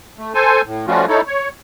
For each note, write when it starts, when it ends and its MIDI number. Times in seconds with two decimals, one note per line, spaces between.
0.18 0.33 57
0.34 0.61 69
0.34 0.61 72
0.34 0.61 80
0.66 0.86 45
0.87 1.06 53
0.87 1.06 55
0.87 1.06 57
0.87 1.06 61
0.87 1.06 65
0.87 1.06 66
1.08 1.21 63
1.08 1.21 64
1.08 1.21 69
1.08 1.21 73
1.27 1.49 73